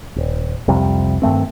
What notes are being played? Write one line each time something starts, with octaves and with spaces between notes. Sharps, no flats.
D#1
C2 F2 C3 G3
G2 D#3 A3 C4